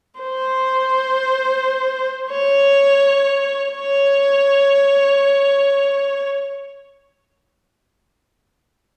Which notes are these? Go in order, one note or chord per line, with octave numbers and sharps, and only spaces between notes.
C5
C#5
C#5